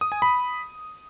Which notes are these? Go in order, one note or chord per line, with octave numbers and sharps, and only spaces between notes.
D#6
G#5
B5